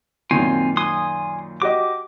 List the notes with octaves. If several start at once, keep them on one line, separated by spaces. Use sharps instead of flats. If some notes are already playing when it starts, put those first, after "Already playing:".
F#2 A#2 D#3 C4 F4 G#5
G#5 C6 D#6
F#4 G4 D#5 D6